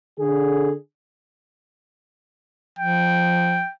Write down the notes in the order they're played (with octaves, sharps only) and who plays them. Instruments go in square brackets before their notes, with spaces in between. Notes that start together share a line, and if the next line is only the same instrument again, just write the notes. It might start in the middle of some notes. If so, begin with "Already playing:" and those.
[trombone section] D3 G#4
[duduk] F3 [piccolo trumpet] G5